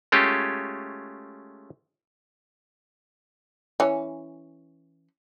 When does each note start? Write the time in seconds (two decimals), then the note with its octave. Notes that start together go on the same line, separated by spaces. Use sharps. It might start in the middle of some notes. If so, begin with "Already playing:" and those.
0.12 G#3 A3 C#4 F4 G4
3.80 E3 C#4